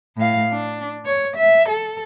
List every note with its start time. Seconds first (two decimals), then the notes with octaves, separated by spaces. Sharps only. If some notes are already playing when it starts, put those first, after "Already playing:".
0.17 A2 F5
0.51 D4
1.06 C#5
1.36 E5
1.68 A4